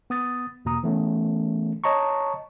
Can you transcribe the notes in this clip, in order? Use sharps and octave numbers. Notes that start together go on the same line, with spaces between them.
B3 D#6 A6
E2 B2 A#3 A#5 D#6
E3 A3 B3 C#4
C#5 D#5 A5 A#5 C#6